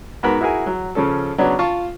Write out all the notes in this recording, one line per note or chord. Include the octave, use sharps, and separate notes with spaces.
G#2 B3 F#4 A#4 B5
E4 F#4 G#4 A#4 G#5
F#3
C#3 F3 C#4 A4
C#3 F#3 B3 C#4 D4
F4 A5 C#6